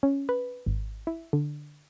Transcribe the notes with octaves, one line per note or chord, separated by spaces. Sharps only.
C#4
B4
G#1
E4
D3